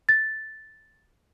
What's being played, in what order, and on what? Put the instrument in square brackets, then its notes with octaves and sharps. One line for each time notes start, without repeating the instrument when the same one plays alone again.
[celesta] A6